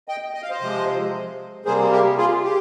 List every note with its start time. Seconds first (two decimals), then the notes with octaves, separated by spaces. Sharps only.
0.08 D#5 G5
0.34 D#5
0.42 F5
0.50 C5 D#5
0.61 C3 F3 G#3
1.65 C3 G3 A#3 G#4 C5
1.91 G4 A#4
2.17 F4 G#4
2.44 G4